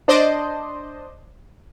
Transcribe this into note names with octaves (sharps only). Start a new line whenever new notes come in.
D4 C5 D5 D#5